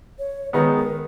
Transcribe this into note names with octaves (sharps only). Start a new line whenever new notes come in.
C#5
D#3 G#3 B3 D#4 B4
A#4